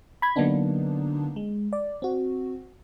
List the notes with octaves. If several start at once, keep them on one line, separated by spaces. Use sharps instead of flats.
B5 G#6
D3 F#3 A#3 B3 D4 D#4
G#3
D5
C4 F#4